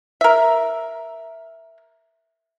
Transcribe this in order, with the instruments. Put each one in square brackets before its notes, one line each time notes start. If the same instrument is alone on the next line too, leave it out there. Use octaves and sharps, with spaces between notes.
[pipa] A#4 E5